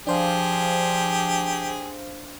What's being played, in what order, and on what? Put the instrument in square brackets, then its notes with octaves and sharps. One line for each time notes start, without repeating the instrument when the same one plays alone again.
[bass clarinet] F3 [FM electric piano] D4 C5 F5 [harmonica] G4 G#4